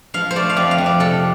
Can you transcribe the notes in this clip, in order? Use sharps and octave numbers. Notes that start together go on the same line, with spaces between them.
F3 F5
C5
A3 D5
F5
F2 D5
F5
F2
D5
C3 A4